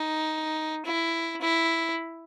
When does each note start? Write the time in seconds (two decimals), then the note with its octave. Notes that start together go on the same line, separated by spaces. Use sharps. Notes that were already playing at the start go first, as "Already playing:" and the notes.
Already playing: D#4
0.85 E4
1.41 E4